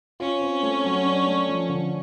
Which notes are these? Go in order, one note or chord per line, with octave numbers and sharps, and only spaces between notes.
C#4 F4
C4
A3
F#3
D4
A3
F3
D3